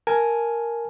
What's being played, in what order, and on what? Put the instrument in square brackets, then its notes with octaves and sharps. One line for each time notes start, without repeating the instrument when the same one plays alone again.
[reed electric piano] A#4 G#5 A5